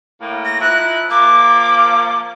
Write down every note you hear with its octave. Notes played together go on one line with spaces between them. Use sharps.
A2 A#3
A#6
F3 D#4 E4 F#6
F3 A#3 D6